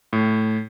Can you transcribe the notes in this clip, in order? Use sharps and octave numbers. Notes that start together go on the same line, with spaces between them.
A2